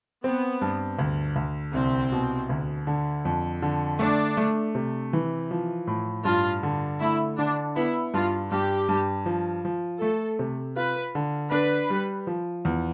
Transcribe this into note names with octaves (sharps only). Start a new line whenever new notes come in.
B3 C4
G2
D2
D2
C2 C4
B2
D2
D3
F2
D3
A3 D4
A3
C3
E3
F3
A2
G2 F4
D3
A3 E4
D3 D4
B3 E4
G2 F4
G2 G4
G2
F3
F3
A3 A4
C3
F4 B4
D3
D4 B4
G3
F3
E2